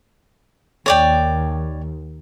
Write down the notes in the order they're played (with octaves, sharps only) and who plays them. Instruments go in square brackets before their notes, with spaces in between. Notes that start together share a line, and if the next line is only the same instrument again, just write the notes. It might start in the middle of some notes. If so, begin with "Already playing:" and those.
[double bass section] D#2 [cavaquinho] C#5 D5 G5